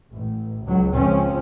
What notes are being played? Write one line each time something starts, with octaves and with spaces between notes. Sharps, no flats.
A1
C#2 F#3
C#2 F3 C4 C#4